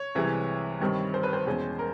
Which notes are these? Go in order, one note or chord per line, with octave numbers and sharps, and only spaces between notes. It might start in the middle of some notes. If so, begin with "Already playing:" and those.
Already playing: C#5
C2 C3 E3 G#3
G2 D#3 G3 C4
C5
B4
C5
E2 B2 G#3 C#4
A#4